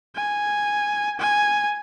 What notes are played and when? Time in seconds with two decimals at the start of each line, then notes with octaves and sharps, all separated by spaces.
0.16 G#5
1.19 G#5